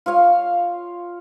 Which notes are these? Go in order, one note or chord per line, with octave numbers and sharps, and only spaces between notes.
F4 C#5 F5